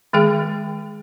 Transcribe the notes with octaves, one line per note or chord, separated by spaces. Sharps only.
D#3 G#3 G#4 G5